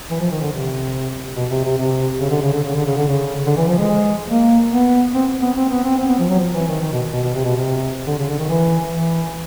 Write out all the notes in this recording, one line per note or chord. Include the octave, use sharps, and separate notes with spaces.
E3
F3
D#3
D3
C3
B2
C3
C3
C3
C#3
D3
C#3
D3
C#3
D3
C#3
D3
C#3
D3
E3
F3
G#3
A#3
B3
C4
B3
C4
B3
C4
C4
B3
F3
F#3
F3
E3
D#3
D#3
B2
B2
B2
C3
B2
C3
D3
C#3
D3
D#3
E3
E3